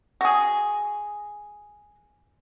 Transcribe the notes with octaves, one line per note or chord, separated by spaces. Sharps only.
F#4 G#4